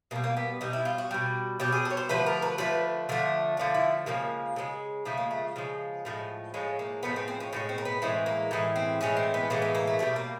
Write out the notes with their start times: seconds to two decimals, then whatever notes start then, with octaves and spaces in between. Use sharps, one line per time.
0.11 B2 A#3
0.15 G3
0.24 A#3
0.37 B3
0.61 B2 G3 D#4
0.73 E4
0.85 F4
0.98 F#4
1.11 B2 G3
1.60 B2 G3 G4
1.72 G#4
1.85 A4
1.90 C#5
1.97 C5
2.09 D3 F3 A3 B4
2.26 A#4
2.42 B4
2.58 D3 F3 A3 B4
3.09 D3 F3 A3
3.57 D3 F3 A3
3.75 E4
4.06 C#3 F3 G#3 A#3
4.56 C#3 F3 G#3
5.05 C#3 F3 G#3 A3
5.18 A#3
5.31 A3
5.56 C#3 F3 G#3
6.05 A2 F3 G#3
6.54 A2 F3 G#3 C#4
6.79 A#3
7.03 A2 F3 G#3 B3
7.16 C4
7.28 C4
7.40 C#4
7.53 A2 F3 G#3 C#4
7.69 C4
7.78 A#3
7.85 B3
8.02 A2 E3 G#3 C4
8.26 A#3
8.51 A2 E3 G#3
8.76 C4
9.01 A2 E3 G#3 C#4
9.17 C4
9.34 B3
9.50 A2 E3 G#3 A#3
9.62 B3
9.75 A#3
9.87 A3
9.99 B2 G3 A3
10.16 A#3